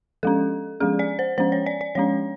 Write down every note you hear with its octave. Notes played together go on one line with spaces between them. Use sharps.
F3 G#3 C#4 A4
F3 G#3 C#4 G#4
D5
C5
F3 G#3 C#4 C5
C#5
D5
D5
F3 G#3 C#4 C#5